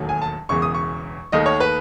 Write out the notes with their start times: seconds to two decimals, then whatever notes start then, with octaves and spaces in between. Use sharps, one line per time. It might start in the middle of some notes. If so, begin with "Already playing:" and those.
Already playing: E1 D#2 D#3 F#3 A3
0.09 G#5
0.22 A5
0.49 E1 E2 C#3 E3 C#6
0.62 D#6
0.74 C#6
1.32 D#2 D#3 A3 D#5
1.46 C#5
1.60 B4